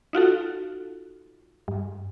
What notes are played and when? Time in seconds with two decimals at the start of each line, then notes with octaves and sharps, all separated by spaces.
0.13 D#4 F4 F#4 A4
1.68 G2